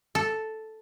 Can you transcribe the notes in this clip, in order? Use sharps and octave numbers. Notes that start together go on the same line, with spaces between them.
A4